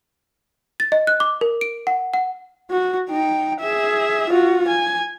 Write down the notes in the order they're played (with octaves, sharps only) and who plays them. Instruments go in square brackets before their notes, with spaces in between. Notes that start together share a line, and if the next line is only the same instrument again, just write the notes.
[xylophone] A6
D#5
F#6
D6
A#4
D7
F#5
F#5
[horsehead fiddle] F#4
D#4 G5
G#4 E5
F4 F#4
G#5